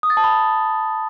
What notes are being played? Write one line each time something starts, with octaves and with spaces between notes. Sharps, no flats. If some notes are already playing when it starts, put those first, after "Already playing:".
D#6
A6
A5
B5